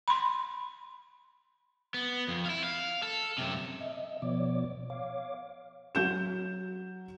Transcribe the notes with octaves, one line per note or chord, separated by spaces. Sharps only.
B5 C6
B3
F2
E4 F5
F5
A4
F#2 C3
D#5 E5
B2 F3 B3 C#5 D5 D6
C#5 F5 D6
F#3 G6 E7